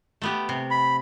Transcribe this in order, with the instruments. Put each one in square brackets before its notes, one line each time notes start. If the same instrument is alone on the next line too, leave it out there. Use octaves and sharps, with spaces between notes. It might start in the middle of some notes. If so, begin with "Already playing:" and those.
[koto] A3 B3 G4
C3
[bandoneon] B5